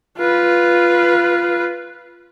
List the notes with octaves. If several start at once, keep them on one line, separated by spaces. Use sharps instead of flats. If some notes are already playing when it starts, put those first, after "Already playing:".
F4 B4